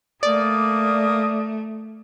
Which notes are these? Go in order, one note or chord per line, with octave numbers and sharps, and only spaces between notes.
A3 A#3 D5 D#6